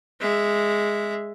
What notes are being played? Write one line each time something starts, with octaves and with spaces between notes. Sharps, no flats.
G#3 E5